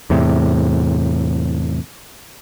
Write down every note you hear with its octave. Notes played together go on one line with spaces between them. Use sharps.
E2 A2 C3